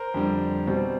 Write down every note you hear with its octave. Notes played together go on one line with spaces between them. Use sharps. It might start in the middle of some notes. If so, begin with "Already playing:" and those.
Already playing: A#4 C5
F2 D3 G3
B2 G3 C4